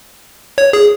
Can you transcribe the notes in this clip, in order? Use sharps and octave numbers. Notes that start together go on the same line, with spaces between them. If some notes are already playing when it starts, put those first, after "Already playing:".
C#5
G#4